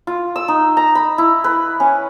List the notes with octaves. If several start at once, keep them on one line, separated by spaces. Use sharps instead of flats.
F4
E6
D#4
A#5
B5
E4
B4
C#4